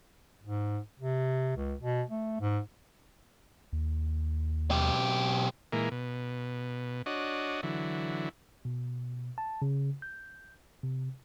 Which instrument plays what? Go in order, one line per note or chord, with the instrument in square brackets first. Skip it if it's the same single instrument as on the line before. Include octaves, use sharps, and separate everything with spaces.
[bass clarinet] G#2
C3
C#2
B2
A3
G#2
[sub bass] D#2
[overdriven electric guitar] B1 G4
[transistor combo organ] A#2 E3 G#3 A#3
B2
D4 F#4 C#5 D#5
D3 E3 F#3
[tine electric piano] B2
A5
C#3
G6
C3